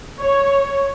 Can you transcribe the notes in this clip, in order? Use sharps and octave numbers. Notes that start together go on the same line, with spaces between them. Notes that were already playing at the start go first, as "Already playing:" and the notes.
C#5